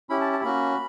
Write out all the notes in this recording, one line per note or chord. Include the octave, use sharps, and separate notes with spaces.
C#4 E4 G4 B5
A5
A5
A#3 C#4 F#4 B5